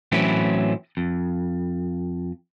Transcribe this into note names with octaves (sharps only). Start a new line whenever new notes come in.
A2 E3 F#3 C4 C#4 E4
F2